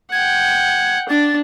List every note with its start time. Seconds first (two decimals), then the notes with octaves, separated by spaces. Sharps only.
0.12 F#5 G5 G#6
1.09 D4 A6